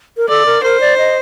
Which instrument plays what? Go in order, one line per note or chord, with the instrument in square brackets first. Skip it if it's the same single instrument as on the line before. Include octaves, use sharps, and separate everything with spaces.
[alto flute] A#4
[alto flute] A4 [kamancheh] D5
[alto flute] A#4
[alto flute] A#4 [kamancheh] C5
[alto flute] D5
D#5